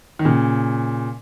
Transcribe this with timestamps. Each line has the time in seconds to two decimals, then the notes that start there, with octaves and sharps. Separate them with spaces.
0.19 D#3
0.25 A#2 C#3